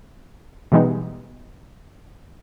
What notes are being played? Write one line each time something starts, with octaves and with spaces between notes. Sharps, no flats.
B2 E3 G3 G#3 B3 D#4